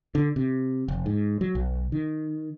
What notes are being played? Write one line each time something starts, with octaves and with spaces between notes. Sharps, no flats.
D3
C3
F1
G#2
F#3
B1
D#3